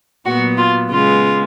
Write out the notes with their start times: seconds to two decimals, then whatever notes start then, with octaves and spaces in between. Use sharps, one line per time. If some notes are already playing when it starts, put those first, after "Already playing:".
0.25 A#2 F#3 B3 F#4
0.57 F4
0.90 C#3 G#3 B3 F4